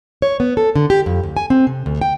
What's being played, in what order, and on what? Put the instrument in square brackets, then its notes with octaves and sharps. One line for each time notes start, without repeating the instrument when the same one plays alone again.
[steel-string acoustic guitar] C#5
B3
A4
D3
G4
F2
D2
G#5
C4
C3
D2
G5